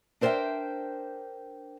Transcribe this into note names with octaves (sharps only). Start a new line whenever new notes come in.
D4 A#4 C5 D5 E5 G5